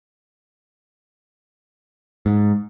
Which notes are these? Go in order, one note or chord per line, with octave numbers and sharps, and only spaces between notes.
G#2